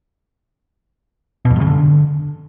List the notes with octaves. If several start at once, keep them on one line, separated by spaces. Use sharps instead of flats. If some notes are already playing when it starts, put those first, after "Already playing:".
B2
F2
G2
C#3
D3